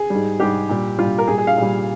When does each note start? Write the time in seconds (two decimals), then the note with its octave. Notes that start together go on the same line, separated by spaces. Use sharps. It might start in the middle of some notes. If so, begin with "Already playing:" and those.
Already playing: G#4
0.10 G#2 G3
0.39 G#2 G3 G4
0.69 A#2 G3
0.99 A#2 G3 F4
1.18 A#4
1.28 A#2 G3 G#4
1.38 G#4
1.47 F5
1.57 A#2 G3